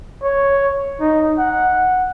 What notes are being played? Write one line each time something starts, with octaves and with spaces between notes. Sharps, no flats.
C#5
D#4
F#5